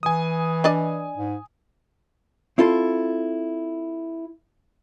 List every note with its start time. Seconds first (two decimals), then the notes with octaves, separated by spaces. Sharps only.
0.03 E3 G#5 D#6
0.64 D4 D5 D#5
1.17 G#2
2.58 C4 E4 F4 A4